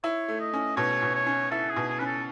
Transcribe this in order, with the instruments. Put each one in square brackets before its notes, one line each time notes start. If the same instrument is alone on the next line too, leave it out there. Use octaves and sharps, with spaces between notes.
[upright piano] E4 [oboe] C#5
[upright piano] A3
[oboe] D#5
[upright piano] C#4
[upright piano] B2 [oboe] C#5
[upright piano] B2
[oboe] C#5
[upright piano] C#4
[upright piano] E4 [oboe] A4
[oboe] G#4
[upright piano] B2
[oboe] G#4
[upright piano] C#4 [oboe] B4
[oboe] A4